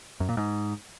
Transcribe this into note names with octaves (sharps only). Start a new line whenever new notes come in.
F#2
A#2
G#2